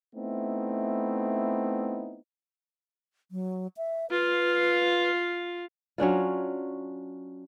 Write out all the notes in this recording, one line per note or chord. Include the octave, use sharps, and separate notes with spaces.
A3 B3 C4 D#4 E4
F#3
E5
F4 B4 F5
F#3 C#4 D4 F4